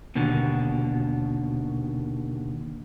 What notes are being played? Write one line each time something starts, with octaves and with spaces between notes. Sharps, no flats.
D#2 B2 D3